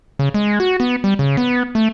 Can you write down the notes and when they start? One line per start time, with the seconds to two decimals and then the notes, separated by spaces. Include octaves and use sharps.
0.19 C#3
0.34 G#3
0.60 F#4
0.80 B3
1.04 G3
1.19 C#3
1.37 B3
1.75 A3